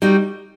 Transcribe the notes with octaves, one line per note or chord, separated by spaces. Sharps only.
G3 D#4 F#4